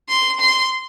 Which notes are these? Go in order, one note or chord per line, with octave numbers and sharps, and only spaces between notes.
C6
C6